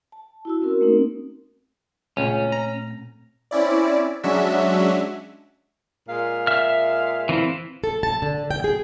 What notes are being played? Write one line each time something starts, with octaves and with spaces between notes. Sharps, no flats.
A5
E4 F#4 E6
C4 C#4 F#4 A#4
A3 A#3 C4 C#4 D#4 A#4
C#2 A#2 A3 C4 C#4
A#5
C4 C#4 E4 D5
F#3 G#3 C#4 D4 F#4 E5
A#2 G#3 F5
E5 F6
E3 C4 E4
A4
A5
D3
G5
G#4